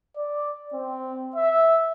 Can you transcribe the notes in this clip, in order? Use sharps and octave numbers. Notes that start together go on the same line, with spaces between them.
D5
C4
E5